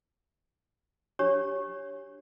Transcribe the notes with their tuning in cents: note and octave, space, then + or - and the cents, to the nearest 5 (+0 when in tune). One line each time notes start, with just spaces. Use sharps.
D4 +0 G4 +0 C#5 +0